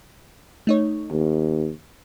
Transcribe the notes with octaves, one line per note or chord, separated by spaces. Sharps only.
A3 D#4 C#5
D#2